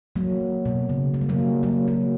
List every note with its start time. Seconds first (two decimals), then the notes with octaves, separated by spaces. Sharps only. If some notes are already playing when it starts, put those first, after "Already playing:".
0.16 F#3 A#3
0.66 B2
0.89 C#3
1.14 A#3
1.21 G3
1.29 F#3 A#3
1.38 G3
1.63 F#3 A#3
1.88 F#3 A#3